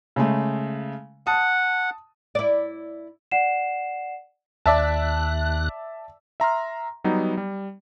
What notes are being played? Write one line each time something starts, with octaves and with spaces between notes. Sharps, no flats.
C#3 G#3 A3
F#5 A5 D#6
E4 D5
D5 F#5 C7 E7
D#2 D5 E5 A5 F#6
E5 A#5 C6 F6
F#3 G3 B3 D#4
G3